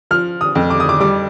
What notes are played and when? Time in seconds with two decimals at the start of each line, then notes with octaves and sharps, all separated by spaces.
0.11 F3 F6
0.41 D#6
0.55 F2
0.70 D6
0.80 D#6
0.89 D6
1.00 G3 D6